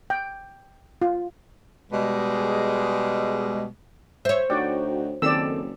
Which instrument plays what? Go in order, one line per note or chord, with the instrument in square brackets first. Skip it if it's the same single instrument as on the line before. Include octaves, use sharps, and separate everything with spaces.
[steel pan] G5
F4
[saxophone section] B2 G3 G#3
[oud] C5 C#5 [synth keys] E5
[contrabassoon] D2 [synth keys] D#4 F#4 G5 [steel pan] D5
[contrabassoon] F#1 [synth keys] D#3 C4 A4 [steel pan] D5 E6